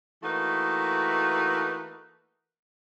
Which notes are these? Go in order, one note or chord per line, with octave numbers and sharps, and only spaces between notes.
E3 A3 A#3 D#4 F#4 B4